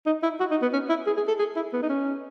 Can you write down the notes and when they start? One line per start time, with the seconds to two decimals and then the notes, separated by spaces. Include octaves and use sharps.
0.06 D#4
0.23 E4
0.40 F#4
0.51 D#4
0.62 B3
0.73 C#4
0.89 E4
1.07 G#4
1.17 G#4
1.28 A4
1.39 G#4
1.56 E4
1.73 B3
1.83 D#4
1.89 C#4